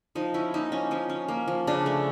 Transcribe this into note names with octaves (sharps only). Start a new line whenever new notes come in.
F3 D#4
C#4 E4
A#3 D#4
F3 C#4
F3 C#4
C#4
A#3
F3
C#3 D4
A3